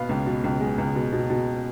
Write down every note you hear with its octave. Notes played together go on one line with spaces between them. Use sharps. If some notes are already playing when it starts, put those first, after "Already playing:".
Already playing: B2 B3 F5
C#2
B2
C#2
G#3
C#2
B2
B2
B2